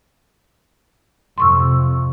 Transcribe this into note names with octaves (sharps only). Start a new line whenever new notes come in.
F2 C3 C6 C#6 E6